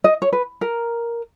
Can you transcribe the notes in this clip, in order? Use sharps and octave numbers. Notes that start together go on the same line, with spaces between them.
D#5
C#5
B4
A#4